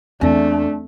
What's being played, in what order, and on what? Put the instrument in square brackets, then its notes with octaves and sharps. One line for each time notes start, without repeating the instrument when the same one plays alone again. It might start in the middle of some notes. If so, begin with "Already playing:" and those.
[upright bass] E2 [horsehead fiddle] A3 [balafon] C4 D5 [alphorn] D4